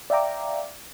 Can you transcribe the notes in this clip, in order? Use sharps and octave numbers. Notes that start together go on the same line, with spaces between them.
D5 E5 F5 G5 A#5 D6